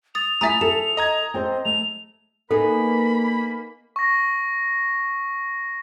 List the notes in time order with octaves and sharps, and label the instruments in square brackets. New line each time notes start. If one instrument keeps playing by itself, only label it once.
[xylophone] D#6 A6 [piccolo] F7
[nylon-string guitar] A3 E4 [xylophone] E5 G#5 A#5 [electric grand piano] D#6 A6 B6
[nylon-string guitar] A4 [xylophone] E7
[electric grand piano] D#5 A#5 G#6
[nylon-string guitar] C4 A4 C5
[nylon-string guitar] A3 [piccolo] F7
[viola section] A#3 [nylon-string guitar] B3 D#4 G#4 [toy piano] A4 [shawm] B5
[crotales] C#6 A#6